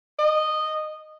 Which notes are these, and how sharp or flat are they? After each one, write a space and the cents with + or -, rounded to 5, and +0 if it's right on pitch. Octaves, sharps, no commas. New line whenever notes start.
D#5 -10